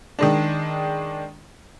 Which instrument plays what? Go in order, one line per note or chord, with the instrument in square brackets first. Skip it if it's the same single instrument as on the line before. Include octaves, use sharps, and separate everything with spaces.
[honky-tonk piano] D#3 G#3 D4